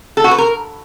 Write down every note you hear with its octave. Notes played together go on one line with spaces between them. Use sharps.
A4
F#4
B4
A#4